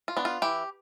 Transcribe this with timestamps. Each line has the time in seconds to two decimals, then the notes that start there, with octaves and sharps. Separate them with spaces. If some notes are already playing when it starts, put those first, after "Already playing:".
0.08 F4
0.17 B3 D4
0.25 F4
0.42 E3 G4